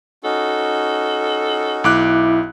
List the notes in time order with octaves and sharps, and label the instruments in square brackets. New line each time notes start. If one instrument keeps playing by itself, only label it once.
[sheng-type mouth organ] C#4 D#4 F#4 [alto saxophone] A4
[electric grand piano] B1 D6 F#6 [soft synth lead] E4